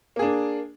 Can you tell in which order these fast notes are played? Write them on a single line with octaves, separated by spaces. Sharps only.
A#3 G#4 D4